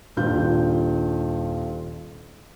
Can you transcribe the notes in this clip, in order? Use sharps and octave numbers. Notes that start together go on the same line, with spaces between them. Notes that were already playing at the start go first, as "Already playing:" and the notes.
D#1 G2 F4 G6